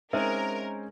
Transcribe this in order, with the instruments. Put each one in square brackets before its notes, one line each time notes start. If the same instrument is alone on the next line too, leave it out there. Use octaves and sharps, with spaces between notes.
[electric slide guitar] G#3 C#4 [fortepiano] C4 D#4 C5 [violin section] A#4 [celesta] E5